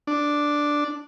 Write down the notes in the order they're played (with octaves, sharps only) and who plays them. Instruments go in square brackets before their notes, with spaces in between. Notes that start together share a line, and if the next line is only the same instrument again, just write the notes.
[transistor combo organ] D4